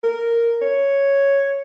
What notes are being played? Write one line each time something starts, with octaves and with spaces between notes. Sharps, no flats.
A#4
C#5